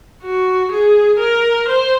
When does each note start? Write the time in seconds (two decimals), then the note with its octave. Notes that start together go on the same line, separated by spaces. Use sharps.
0.23 F#4
0.71 G#4
1.19 A#4
1.68 C5